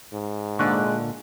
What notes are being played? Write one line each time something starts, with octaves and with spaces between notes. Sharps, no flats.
G#2
A#2 D3 G#3 C#6 F#6